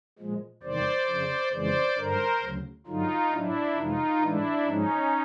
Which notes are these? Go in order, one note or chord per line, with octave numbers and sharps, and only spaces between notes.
A#2 F3 G#3
E2 C3 D#3 G3 C5 D5
F2 C#3 F3
F2 C#3 E3 G#3 C5 D5
G2 D3 G3 A#4 C5
D2 C#3 F#3
G2 D3 F#3 D#4 F4
A2 F#3 D4 E4
F2 C3 E3 G#3 D#4 F4
A2 E3 G#3 D4 E4
G#2 F3 G#3 C#4 D#4